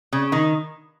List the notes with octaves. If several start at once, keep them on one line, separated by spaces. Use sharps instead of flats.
C#3
D#3